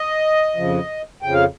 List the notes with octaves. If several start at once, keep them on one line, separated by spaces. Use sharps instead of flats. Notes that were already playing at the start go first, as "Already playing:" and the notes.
Already playing: D#5
F2 C#3 F3
F2 C#3 F3 G5
F5